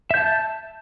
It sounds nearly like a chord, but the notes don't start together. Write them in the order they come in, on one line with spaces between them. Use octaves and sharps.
E5 G6 A5